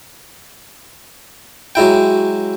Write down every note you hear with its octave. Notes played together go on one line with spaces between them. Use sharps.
F#3 G#3 E4 G5